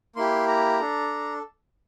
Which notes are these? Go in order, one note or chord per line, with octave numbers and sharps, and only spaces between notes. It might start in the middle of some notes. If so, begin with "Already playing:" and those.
A#3 E4 G4 C6
A#5
D4 A4